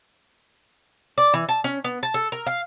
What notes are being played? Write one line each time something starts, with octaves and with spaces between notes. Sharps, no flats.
D5
E3
A5
C#4
B3
A5
A4
A#4
F5